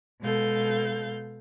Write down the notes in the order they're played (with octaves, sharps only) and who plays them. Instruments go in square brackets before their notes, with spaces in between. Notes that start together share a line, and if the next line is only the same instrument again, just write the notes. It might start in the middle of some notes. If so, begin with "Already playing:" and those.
[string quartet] B2 G#3 A4 F5 G6